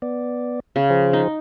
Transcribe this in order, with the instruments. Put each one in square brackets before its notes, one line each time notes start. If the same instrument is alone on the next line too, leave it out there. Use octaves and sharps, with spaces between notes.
[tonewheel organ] B3 D5
[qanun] C#3
[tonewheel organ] F3 G#4 C5
[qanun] D#4